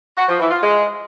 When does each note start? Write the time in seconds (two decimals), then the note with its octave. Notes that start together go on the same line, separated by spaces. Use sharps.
0.18 F#4
0.29 F3
0.40 E3
0.51 F4
0.62 G#3